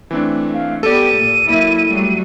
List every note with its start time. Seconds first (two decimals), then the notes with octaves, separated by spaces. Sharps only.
0.11 E3 A3 C4 D4
0.54 F5
0.83 B3 G4 A4 D5 D#7
1.14 A#2
1.49 F#3 A#3 E4
1.87 F#3 G3 A3